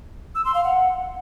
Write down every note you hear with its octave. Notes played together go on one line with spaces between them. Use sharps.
E6
C6
F5
F#5